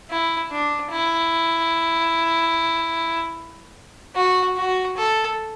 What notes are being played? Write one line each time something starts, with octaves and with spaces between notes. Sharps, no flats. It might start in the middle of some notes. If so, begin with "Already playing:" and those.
E4
D4
E4
F#4
F#4
A4